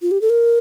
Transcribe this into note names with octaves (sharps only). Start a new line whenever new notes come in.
F4
G4
A4
A#4